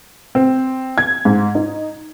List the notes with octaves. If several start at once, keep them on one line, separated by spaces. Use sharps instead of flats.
C4
G#6
G#2
D#4